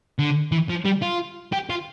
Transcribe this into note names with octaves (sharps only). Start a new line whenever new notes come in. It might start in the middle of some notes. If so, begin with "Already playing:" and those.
D3
E3
F3
G3
F4
G4
F4